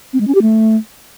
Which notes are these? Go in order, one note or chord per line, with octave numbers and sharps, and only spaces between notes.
C4
G#3
C#4
G4
A3